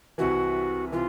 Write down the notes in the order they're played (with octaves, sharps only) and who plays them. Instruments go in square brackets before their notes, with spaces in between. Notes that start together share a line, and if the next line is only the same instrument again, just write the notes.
[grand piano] C2 C3 E3 [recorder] F#4
[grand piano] C3 E3 [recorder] F4